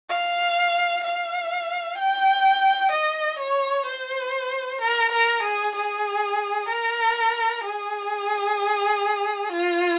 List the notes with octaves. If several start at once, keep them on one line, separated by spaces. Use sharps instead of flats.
F5
F5
G5
D#5
C#5
C5
A#4
A#4
G#4
G#4
A#4
G#4
F4